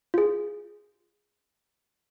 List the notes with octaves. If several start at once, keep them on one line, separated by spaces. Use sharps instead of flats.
F4 G#4